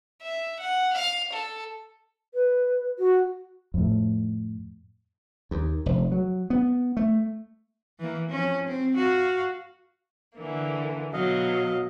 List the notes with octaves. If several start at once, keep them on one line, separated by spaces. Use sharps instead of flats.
E5
F#5
F5
A4
B4
F#4
F2 A2
D#2
F1
F#3
B3
A3
E3 A#3
F3 C#4
C4
F#4 F5
D3 E3 A#3
B2 F#3 D#5 F5